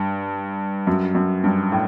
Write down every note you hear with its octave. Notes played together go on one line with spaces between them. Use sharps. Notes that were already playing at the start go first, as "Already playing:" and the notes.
Already playing: G2
F#2
F#2
G2
A2